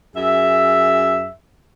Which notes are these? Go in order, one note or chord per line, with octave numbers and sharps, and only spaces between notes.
F#2 G#4 E5